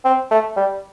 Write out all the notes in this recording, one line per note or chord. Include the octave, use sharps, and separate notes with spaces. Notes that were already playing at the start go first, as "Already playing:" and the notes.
C4
A3
G3